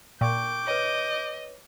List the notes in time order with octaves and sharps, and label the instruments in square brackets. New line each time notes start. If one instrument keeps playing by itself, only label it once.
[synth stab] A#2 [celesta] G5 C#6 [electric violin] D6 G6
[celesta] B4 C#5 [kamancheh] D#5